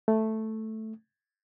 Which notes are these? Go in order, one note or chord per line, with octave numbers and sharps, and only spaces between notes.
A3